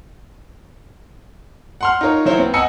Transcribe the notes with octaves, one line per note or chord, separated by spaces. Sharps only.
F#5 C6 F6
D#4 F4 A#4 C#5
F#3 E4 C5 C#5
B3 C4
D#5 F#5 G#5 E6 C#7